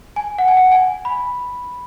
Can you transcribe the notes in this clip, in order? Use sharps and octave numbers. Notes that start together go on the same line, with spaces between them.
G#5
F#5
G#5
F#5
G#5
B5